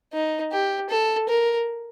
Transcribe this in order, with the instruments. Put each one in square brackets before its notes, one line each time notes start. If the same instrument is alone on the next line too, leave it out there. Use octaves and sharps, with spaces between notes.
[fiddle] D#4
G4
A4
A#4